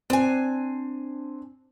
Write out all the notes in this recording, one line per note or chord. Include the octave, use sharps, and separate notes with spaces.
C4 D4 G#5